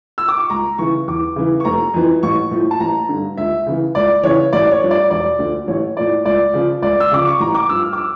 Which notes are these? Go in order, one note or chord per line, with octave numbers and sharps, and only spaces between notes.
E6
D6
C#6
C#2 A#5
C#3 E3 C#6
E2 D6
C#3 E3
C#6
F1 A#5
F2 E3
A1 C#6
A2 F3
A5
A1 A#5
G2 D3
C#2 E5
C#3 E3
C#2 D5
C#3 E3 C#5
A1 D5
C#5
G2 F3
D5
E1 D5
D2 D3 F3
A1 C#5
A2 F3 D5
C#2 D5
C#3 F3
C#2 D5
E6
C#3 F3 D6
C#6
A1 A#5
D6
G2 F3 E6
F6
D6
E6